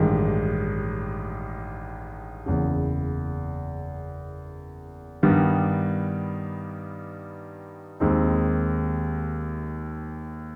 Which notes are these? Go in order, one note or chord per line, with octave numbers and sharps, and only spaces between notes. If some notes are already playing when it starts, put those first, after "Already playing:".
Already playing: A1 G2 D#3 G#3
F#1 E2 C#3
G2 D#3 G3 B3
D#2 D#3 G#3 C4 D#4